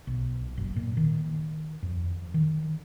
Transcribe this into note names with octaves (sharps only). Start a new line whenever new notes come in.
B1
F#1
A#2
D#3
F2
D#3